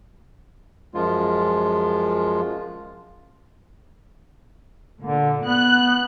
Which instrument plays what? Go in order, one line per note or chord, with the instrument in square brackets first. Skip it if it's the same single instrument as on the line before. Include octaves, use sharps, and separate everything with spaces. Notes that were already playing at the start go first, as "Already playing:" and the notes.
[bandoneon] F#2 F3 G#3 F4
[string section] A#2 [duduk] D3
[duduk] B3 [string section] F#6